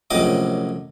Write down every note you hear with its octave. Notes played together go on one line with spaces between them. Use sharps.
A#1 F#2 A2 C3 D#5 D6